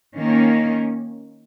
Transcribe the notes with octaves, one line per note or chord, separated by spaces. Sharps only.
D#3 A#3 C#4